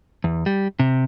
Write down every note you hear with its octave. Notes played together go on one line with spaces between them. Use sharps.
E2
G3
C3